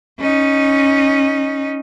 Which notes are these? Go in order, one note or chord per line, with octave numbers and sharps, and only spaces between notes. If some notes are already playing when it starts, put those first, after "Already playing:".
C#4 D#4